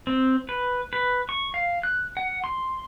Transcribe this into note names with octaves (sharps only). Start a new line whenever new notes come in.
C4
B4
B4
C#6
F5
F#6
F#5
C6